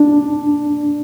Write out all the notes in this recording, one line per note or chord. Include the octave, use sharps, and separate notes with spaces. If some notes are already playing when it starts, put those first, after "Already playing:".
Already playing: D4